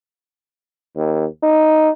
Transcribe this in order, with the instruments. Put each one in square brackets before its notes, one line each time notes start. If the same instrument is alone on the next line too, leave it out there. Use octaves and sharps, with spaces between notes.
[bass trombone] D#2
D#4